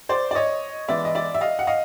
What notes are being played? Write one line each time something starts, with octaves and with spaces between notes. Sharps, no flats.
C5 D5
D5
C#5 D#5
E3 G#3 B3 D5 E5
D#5
D5 E5
E5
D#5 F5
F#5
D#5 F5